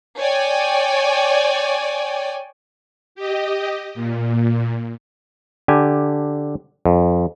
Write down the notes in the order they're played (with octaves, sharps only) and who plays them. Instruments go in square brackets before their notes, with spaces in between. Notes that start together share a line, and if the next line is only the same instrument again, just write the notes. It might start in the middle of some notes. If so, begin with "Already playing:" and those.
[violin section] C#5 D5 G5 G#5
[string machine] G4 D#5
A#2
[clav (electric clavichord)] D3 G4 G#5
F2